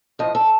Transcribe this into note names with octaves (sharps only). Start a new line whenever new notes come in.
A2 F3 D#5
A4